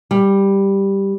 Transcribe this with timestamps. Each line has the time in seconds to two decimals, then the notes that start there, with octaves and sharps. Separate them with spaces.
0.11 G3